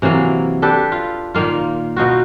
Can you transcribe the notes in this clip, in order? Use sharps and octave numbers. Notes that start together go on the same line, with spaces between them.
C3 E3 F#3 A#3
D4 G4 A4 B4
F4
A#2 D#3 A#3 F4
B2 D#4 F4 F#4